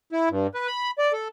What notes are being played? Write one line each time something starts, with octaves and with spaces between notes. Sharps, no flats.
E4
G2
B4
B5
D5
A4